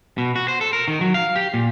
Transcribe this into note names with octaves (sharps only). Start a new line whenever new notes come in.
B2
F#4
C5
A4
A#4
D#3
F#3
F5
G4
A#2